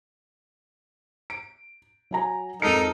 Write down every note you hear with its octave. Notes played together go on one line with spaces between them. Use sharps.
D7
F#3 G#5 A#5
F2 G#3 D#4 A4 A#4 C#7